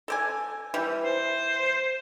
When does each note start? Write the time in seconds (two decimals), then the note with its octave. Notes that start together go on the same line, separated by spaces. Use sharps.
0.08 A4 D5 G#5
0.74 E3 G3
1.05 C5